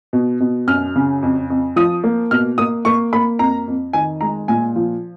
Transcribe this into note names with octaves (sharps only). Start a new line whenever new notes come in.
B2
B2
F#2 F6
C#3
F2
F2
F3 D#6
A#3
B2 F6
A#3 D#6
A#3 C#6
A#3 B5
F2 A#5
F2
D#3 G#5
G#3 A#5
A#2 G#5
F3